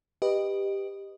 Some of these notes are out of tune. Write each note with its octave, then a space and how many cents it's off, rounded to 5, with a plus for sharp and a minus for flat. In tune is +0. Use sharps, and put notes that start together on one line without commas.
G4 +5 B4 +0 D#5 -10